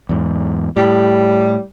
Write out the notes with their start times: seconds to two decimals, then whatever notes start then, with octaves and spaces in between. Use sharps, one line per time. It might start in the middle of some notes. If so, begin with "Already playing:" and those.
0.09 E2 G#2
0.77 A2 G3